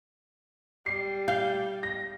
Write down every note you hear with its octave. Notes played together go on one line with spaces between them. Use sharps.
G3 C7
F5 G6
A#6